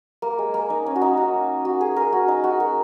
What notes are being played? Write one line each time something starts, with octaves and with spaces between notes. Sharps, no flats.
A#3
G#3
A#3
D#4
C#4
F#4
D#4
F#4
F#4
G#4
A#4
F#4
D#4
F#4
A#4